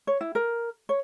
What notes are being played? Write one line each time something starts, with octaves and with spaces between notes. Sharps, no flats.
C#5
E4
A#4
C#5